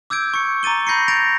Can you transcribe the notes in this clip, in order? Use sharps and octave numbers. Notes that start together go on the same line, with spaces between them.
D6 E6 G6 G#6 D7
C#6 C#7
A#5 D6 A6 D#7 G7
B5 G6 A#6 C7 C#7
G6 A6 A#6 D7 F7